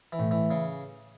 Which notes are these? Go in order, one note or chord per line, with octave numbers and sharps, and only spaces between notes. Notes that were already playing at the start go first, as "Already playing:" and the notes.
E3
A2
E3
C#3